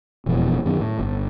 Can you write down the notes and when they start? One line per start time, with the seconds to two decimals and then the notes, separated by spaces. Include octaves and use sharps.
0.26 E1 F2 B2 E3
0.65 F#2 D#3
0.80 A2
0.99 G1